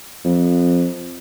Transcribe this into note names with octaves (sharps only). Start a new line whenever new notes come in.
F2